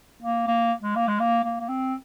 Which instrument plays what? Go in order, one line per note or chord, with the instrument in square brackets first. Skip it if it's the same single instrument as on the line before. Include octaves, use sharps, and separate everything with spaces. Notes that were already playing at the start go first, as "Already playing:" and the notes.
[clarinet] A#3
A#3
G#3
A#3
G#3
A#3
A#3
A#3
C4